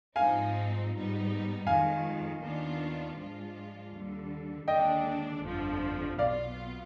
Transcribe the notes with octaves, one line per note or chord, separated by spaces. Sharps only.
G#2 F3 G#3 C4 D#4 F5 G#5
G#2 G3 B3 D#4
F2 D#3 G#3 F5 G#5
D#2 D#3 B3 D4 F4
G#2 F3 G#3 D4 F4
D#2 D3 G3
D#2 D3 G#3 D4 D#5 G5
G1 F2 D3 F3
B1 B2 B3 F4 D5 F5